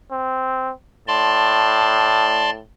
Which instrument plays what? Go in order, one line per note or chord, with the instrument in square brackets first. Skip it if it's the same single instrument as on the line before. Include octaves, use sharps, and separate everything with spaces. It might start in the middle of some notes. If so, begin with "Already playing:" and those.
[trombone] C4
[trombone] A2 [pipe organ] D5 A5 C6